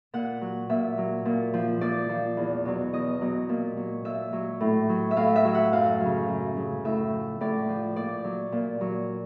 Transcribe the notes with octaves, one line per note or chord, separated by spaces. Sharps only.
A#2 F#5
F#3
A#2 E5
F#3
A#2
F3
A#2 D5
F3
E2
B2 F#3
E2 D#5
B2 F#3
A#2
F#3
A#2 E5
F#3
A2
F#3
E5
A2 F5
E5
F#3
F#5
F#2 F5
C#3 F#3
F#2
C#3 F#3
A2 E5
F3
A2 D5
F3
A#2 D5
F#3
A#2
F#3